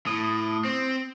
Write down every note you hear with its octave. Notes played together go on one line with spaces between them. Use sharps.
A2 D#6
C4